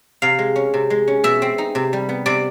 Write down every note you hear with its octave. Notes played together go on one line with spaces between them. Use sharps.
C3 F5
G#3
C#4
C3
G#3
C#4
B2 E5
C4
D#4
C3
G3
B3
C3 D5